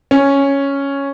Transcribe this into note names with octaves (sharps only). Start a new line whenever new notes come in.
C#4